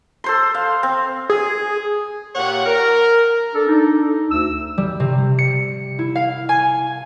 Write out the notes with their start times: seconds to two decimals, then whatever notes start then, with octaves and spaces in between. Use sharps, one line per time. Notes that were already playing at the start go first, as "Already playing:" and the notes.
0.24 A4 C5 C6
0.54 F5
0.83 C4
1.30 G#4
2.35 A#2 G4 C#5 F#5
2.66 A#4
3.55 D4 A4
3.68 D4 D#4
4.31 D2 E6
4.78 G3
5.00 C3
5.39 C#7
5.99 E4
6.15 F5
6.49 G#5